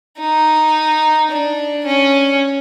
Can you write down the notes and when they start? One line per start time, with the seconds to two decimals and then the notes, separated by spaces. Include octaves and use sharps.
0.20 D#4
1.30 D4
1.85 C#4